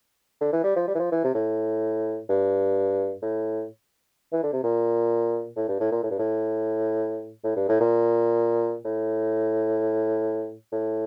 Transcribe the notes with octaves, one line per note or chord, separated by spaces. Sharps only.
D3
E3
G3
F3
G3
E3
F3
E3
C3
A2
G2
A2
E3
D3
C3
A#2
A2
G2
A2
A#2
A2
G2
A2
A2
G2
A2
A#2
A2
A2